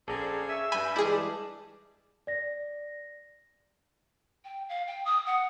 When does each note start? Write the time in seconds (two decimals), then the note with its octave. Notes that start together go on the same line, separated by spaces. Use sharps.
0.08 A#1 C#3 C4 G#4 A4 D5 A#5
0.49 E5 G#5 C#6
0.72 G2 G3 G#5 B5 G6
0.96 E3 G#3 E4 G#4 D5 A5
2.27 D5 A#6
4.45 G5
4.69 F5
4.88 G5
5.05 D#6
5.26 F#5